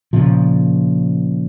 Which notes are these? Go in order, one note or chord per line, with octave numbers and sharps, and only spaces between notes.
A#2 C#3 F3